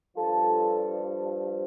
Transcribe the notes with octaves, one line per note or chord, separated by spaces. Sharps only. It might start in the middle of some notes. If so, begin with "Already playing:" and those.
G2 F3 F4 A4